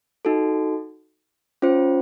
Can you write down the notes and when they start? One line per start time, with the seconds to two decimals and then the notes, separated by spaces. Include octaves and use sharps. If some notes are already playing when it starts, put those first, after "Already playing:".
0.25 D#4 F#4 A4
1.62 C#4 F4 C5